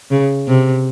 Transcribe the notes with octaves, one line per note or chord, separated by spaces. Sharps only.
C#3
C3